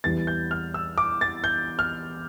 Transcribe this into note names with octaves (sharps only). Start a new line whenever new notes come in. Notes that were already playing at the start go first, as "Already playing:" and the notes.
E2 E3 G3 A6
G6
F6
E6
D6
A6
G6
F6